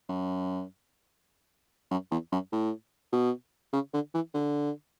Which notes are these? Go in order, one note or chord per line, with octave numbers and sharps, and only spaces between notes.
F#2
F#2
E2
F#2
A2
B2
C#3
D3
E3
D3